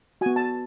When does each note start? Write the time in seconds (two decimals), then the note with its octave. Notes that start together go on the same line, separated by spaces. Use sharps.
0.21 B3 F#4 G#5
0.36 A5